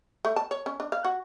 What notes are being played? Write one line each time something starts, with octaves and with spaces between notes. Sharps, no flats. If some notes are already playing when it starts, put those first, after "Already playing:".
A3
A5
C#5
C#4
D4
F5
F#4